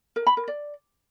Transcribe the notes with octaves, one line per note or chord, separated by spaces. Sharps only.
A#4
B5
A#4
D5